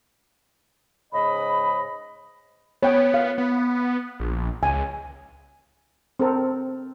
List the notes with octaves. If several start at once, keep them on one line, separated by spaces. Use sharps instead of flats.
G#2 C#3 D#5 B5
B3 C#5 G5
F5
B3
A#1
C#2 G#5
C4 A4 A#4